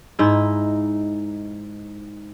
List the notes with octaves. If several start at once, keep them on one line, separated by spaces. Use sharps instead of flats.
G#2 D#4 E4